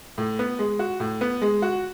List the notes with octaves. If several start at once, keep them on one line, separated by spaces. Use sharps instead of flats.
A2
B3
G#3
F#4
A2
B3
G#3
F#4